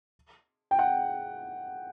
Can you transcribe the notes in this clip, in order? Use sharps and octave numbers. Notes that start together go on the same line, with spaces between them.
G5
F#5